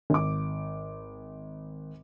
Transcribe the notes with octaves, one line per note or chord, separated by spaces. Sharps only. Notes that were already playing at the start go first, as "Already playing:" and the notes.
G#1 D6